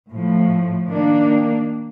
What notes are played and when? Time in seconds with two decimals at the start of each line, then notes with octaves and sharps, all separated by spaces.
0.11 A2 F3 A3
0.88 D#3 A#3 D4